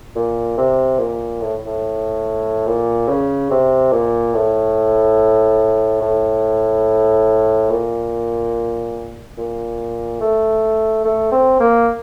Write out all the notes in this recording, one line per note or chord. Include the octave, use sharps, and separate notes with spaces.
A#2
C3
A#2
A2
A2
A#2
C#3
C3
A#2
A2
A2
A#2
A#2
A3
A3
C4
A#3